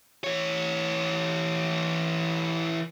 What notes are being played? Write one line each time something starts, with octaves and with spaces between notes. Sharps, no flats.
E3 C#5